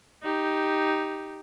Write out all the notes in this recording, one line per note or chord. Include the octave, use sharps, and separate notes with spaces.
D#4 G4